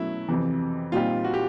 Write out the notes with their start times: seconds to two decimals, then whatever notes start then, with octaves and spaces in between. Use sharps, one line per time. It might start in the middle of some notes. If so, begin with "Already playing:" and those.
Already playing: B2 F#3 A3 C#4 E4
0.28 F2 C3 E3
0.92 A#2 G3 C4 D#4 F4 G4
1.24 F#4
1.34 G4